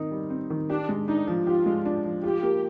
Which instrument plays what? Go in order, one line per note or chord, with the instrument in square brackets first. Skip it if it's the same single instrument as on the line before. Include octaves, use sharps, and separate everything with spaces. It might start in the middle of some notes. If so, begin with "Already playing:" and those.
Already playing: [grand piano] D#3 C4 D#4
G3
C4
D#3
[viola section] D4 [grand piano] G4
[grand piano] G#3
[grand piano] D4 [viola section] D#4
[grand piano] F3
[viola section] F4 [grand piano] G4
[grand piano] G#3
D4
F3
[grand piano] F4 [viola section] G4
[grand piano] A#3